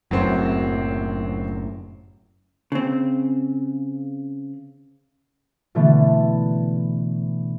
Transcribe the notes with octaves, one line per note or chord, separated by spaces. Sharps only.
F#1 F#2 A2 F#3 C4
C#3 C4
B2 D3 E3 A3 B3